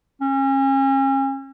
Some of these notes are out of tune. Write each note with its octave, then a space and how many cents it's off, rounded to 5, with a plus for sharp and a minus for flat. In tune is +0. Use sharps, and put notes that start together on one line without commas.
C#4 -35